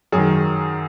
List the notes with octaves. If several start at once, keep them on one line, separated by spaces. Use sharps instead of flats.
F#2 G#4
D#3